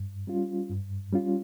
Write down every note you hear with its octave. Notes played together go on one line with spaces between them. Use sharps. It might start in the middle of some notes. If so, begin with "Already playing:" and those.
Already playing: G2
G3 C#4 F4
G2
G3 C#4 F4